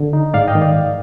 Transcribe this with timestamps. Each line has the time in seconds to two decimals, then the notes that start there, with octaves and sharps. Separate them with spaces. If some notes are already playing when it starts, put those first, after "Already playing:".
Already playing: D3
0.13 D#4
0.34 G#2 D5 F5
0.48 D#5 G5
0.55 D#3
0.62 D5 F5
0.76 G#2